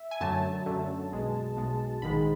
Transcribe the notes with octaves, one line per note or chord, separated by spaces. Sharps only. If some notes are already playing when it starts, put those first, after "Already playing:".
Already playing: E5
G#5
F#2 D3 F#3 A3 A5
F#2 D3 F#3 A3
B1 B2 G#3
B1 B2 G#3
A#1 G#2 D#3 G#3 B5